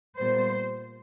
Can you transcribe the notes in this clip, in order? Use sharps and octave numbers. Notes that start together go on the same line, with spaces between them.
A#2 G3 B3 C5